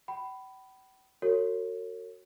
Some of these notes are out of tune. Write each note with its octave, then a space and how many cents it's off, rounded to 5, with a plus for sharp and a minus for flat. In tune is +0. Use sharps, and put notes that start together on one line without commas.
G5 -45 B5 +5
F#4 +0 A#4 -45 C#5 -10